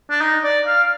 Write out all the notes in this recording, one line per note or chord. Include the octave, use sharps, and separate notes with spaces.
D4
D#4
D5
F5